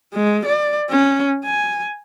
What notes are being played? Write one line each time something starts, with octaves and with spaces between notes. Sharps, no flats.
G#3
D5
C#4
G#5